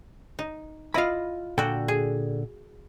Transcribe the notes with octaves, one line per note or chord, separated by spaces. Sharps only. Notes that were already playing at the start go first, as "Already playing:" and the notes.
D#4
E4 F4 D#5 F5 B5
A#2 D3 F#4 A4 G5
G#4